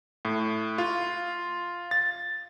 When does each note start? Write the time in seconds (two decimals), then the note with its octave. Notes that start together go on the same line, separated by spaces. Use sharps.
0.25 A2
0.78 F4
1.91 A6